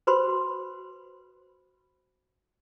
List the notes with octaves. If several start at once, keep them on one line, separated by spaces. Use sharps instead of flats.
F#4 B4 C5 B5 C6